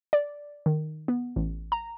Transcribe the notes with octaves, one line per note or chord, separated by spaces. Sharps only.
D5
D#3
B3
A1
A#5